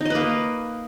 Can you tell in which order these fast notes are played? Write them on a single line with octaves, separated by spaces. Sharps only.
D#4 D#5 B4 A#3